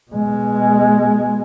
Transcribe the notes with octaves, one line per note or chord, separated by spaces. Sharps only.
B2 G#3